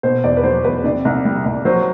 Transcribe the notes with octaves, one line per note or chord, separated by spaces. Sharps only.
B2 C5
E2 D5
B4
F#3 C5
E2 B4
C3 D5
C2
G3
C2
F#3 C5